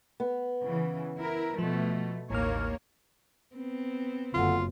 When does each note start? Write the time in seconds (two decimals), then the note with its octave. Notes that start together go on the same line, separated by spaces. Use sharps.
0.20 B3
0.64 C#3 E3
1.17 E4 A#4
1.59 B2 F3 A3
2.30 A1 D#2 A#3 C#5 F6
3.56 B3 C4
4.34 F#1 D3 F4